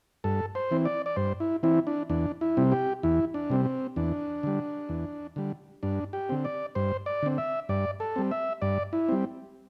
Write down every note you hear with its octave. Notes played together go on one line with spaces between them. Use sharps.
G2 A4
C5
E3 C4
D5
D5
G2 C5
E4
E3 C4 E4
D4
E2 D4
E4
C3 G3 C4
G4
E2 E4
D4
C3 G3 C4
C4
E2 D4
D3 G3
E2
D3 G3
G2 D4
G4
D3 C4
D5
G2 C5
D5
D3 C4
E5
G2 D5
A4
G3 C4
E5
G2 D5
E4
G3 C4